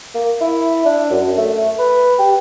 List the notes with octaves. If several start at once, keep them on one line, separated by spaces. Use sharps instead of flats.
A#3
E4
D4
F#2
A3
B4
G4